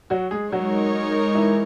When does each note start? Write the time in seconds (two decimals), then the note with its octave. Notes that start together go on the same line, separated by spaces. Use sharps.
0.10 F#3 F#4
0.31 G#3 G#4
0.52 F#3 G#3 D#4 F#4 A#4 C#5
1.35 E3 E4